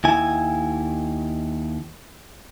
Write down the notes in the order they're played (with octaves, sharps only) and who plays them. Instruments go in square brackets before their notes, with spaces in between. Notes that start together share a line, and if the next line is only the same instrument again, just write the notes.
[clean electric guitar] D#2 E4 G#5